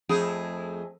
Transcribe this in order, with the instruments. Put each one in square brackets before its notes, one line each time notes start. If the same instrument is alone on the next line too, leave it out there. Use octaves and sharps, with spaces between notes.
[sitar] F2 A3 G#4